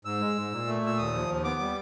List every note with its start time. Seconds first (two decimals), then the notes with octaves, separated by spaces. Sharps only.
0.05 G#2 E6
0.21 G#3
0.36 G#2
0.52 A#2
0.67 A3
0.82 A#2 E6
0.98 D#2 D#6
1.13 F3
1.29 D#2
1.44 B3 D6
1.60 G3